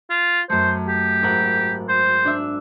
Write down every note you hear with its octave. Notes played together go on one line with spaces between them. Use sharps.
F4
F#2 A3 C5
G4
G#1 A#4 F#5
C5
D4 E5